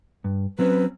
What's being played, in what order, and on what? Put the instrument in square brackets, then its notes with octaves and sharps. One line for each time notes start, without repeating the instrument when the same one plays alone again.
[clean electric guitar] G2
[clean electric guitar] F#3 C4 C#4 [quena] B4